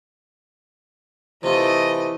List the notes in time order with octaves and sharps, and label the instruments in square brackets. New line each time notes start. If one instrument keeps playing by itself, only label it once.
[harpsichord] C3 F4 [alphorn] E3 [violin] A3 D#5